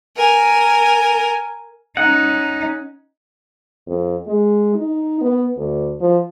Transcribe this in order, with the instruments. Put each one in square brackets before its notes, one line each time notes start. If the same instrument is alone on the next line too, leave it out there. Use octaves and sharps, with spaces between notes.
[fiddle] A#4 G#5
[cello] C#4 D#4 [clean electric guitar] F#5
[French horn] F2
G#3
D#4
B3
D2
F3